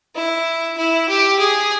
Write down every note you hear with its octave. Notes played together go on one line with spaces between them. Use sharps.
E4
E4
G4
G#4